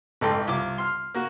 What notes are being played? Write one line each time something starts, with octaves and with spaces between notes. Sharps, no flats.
A1 G#2 A4 G5 C6
C2 F4 D6
C6 F6
A#3 F#4